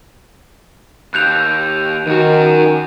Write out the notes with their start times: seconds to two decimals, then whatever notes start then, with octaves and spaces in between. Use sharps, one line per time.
1.14 D#2 F#6 G6 F7
2.07 F#2 D#3 F#4